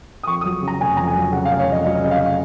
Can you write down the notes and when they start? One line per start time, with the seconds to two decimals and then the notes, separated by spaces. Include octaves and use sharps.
0.23 D#6
0.27 F2 C#6
0.41 F#3 D#6
0.62 C#3
0.68 A#5
0.80 F1 G#5
0.97 F2 A#5
1.07 G#5
1.15 F#3
1.32 C#3 F#5
1.45 F1 F5
1.59 C#5
1.68 F2 D#5
1.85 F#3 D#5
2.04 C#3 D#5
2.11 F5